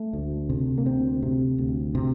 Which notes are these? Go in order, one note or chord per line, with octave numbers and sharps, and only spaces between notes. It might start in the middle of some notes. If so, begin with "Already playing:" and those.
Already playing: A3
D2
C3
A#3
D2 C4
C3
D2
C3